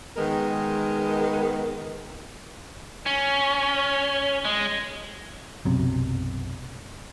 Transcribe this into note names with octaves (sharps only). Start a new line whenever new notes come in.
D#3 G#3 B3 A#4
C#4
G#3
B1 F#2 C3